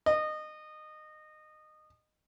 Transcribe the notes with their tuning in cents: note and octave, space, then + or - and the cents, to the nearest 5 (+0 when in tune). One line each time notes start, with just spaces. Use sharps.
D#5 -20